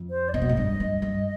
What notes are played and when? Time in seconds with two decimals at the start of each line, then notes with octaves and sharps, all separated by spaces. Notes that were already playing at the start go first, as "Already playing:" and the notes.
Already playing: F2
0.10 C5
0.29 D5
0.33 C3 D#5
0.42 B2
0.49 G#2
0.56 G2 D#5
0.80 G2
0.92 D#5
1.02 G2